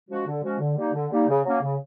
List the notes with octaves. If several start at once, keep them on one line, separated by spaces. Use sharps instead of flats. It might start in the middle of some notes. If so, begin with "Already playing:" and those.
F3 G#3 C#4 F#4
D3
F3 G#3 C#4 F#4
D3
G3 A#3 D#4
D3
G3 A#3 D#4
C#3
F#3 A#3 C#4
C#3